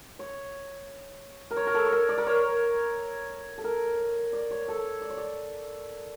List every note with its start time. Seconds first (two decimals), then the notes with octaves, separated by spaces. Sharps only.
0.19 C#5
1.51 A#4
1.57 C#5
1.67 A#4
1.75 A4
1.86 C#5
1.92 A#4
2.09 D5
2.18 A#4
2.27 C#5
3.58 A4
3.64 A#4
4.33 D5
4.51 C#5
4.68 A4
5.02 D5
5.10 C#5
5.17 D5